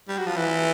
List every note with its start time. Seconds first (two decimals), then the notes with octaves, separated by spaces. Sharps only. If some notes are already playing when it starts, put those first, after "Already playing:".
0.08 G3
0.18 F#3
0.27 F3
0.36 E3